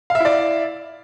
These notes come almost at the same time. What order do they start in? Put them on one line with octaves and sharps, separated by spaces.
F5 E5 E4 D5